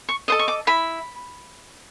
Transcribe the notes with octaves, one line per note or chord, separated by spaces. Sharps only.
C#6
A4 C5 D#5 D#6
C#6
D6
E4 B5